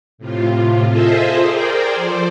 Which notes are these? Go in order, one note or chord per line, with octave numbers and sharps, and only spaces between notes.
A2 C3 F4
F4 G#4 A4 C5 D#5 E5
G#4 A#4 C5 D5 G5
F3 A4 C5 D5